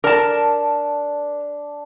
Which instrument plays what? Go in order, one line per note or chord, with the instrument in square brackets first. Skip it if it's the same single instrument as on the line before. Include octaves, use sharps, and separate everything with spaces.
[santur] D4 [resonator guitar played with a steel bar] A#4 A5